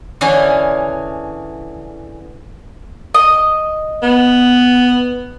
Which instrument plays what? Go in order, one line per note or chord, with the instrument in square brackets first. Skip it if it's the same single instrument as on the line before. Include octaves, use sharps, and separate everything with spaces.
[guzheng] D3 E3 C#4 D4 G#4
[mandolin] D#5
[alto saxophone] B3